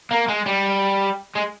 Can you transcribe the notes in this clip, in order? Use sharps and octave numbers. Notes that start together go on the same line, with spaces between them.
A#3
G#3
G3
G#3